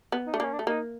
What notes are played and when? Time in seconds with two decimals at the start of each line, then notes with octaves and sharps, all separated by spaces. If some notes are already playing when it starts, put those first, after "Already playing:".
0.12 B3
0.27 D#4
0.34 A3 D4
0.40 A#3 C#4
0.53 D4
0.59 A3
0.67 A#3 D#4